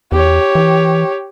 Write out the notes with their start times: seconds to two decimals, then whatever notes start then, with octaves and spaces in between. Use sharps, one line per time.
0.12 E2 G4 C#5
0.55 E3